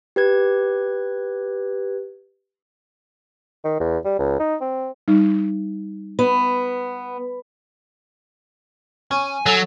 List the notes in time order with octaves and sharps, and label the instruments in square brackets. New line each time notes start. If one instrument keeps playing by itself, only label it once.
[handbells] G4 B4 G#6
[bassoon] D#3
E2
G3
C#2
D#4
C4
[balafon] G3 D#4
[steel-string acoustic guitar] B3
[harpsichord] C#4 [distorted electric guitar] G#5
[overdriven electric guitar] F#3 [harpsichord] A4